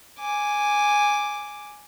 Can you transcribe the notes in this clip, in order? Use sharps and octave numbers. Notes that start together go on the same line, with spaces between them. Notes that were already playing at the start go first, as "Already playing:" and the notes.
G#5 D6